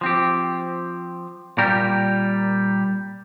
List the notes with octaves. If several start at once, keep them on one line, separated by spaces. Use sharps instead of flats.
F3 C4 G4
A#2 G3 A#3 G4 A#4